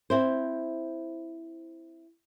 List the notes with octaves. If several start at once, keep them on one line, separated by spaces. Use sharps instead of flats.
C4 E4 C5